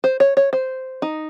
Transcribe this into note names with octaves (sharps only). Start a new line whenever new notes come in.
C5
C#5
C#5
C5
D#4